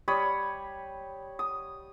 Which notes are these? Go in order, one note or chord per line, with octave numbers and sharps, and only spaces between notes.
G3 C#5 B5 D#6
D#6